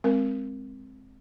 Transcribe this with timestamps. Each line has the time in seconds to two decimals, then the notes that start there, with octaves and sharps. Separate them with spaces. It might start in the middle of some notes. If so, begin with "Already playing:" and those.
0.04 G#3 C4 A#4